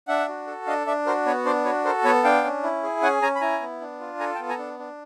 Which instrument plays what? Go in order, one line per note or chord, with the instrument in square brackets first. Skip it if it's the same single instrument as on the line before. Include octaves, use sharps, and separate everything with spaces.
[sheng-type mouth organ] D4 E5 F#5
F#4
A4
D4 D#5 F5
D4 D5 E5
F#4 A#4 C5
B3 B4 C#5
D4 C5 D5
F#4 B4 C#5
A4 A#4 C5
B3 B4 C#5
D4 F5 G5
C#4
E4
G#4
C#4 F#5 G#5
C#4 G#5 A#5
B5
E4 G#5 A#5
B3
D4
F4
A4 G#5 A#5
G5 A5
B3
G#5 A#5
D4
D4